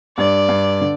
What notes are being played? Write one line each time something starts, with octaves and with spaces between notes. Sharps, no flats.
G2 D5
G2
D3